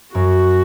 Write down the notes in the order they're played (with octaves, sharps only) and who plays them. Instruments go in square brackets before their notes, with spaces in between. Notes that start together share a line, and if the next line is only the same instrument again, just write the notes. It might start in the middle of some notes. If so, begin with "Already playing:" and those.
[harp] F#2 [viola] F#4